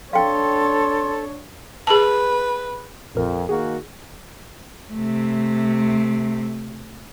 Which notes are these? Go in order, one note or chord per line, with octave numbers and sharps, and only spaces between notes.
D4 A4 C#5 F5 G5 C6
G#4 B4 A5
A#1 F2 A#4
D#3 A#3 F#4 G#4
C3 A3